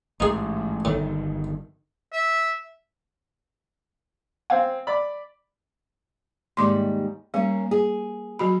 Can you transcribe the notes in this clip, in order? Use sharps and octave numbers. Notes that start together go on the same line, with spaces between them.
A1 G#2 D#4 G#4
G1 A2 D#3
E5
C4 F5 G#5
D5 B5 D6
D#2 G#2 G3 C6 D6
G3 A#3 C#4
G#4
F#3 F#4 B5